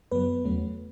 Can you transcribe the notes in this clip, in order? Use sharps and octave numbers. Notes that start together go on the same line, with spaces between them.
F#2 C#3 F#3 B3 B4
E2 C#3 F#3 A3 C#4